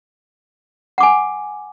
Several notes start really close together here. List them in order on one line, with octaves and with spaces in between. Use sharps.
F#5 D6 G#5